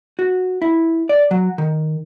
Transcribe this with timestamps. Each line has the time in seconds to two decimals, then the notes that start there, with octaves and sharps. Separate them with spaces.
0.19 F#4
0.62 E4
1.09 D5
1.31 F#3
1.58 D#3